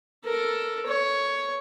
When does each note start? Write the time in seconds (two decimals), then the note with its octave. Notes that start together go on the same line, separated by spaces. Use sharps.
0.25 A4 A#4
0.87 C#5